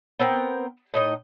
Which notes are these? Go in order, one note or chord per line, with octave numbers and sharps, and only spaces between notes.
B3 C4 A#4 G5
A2 D#4 D#5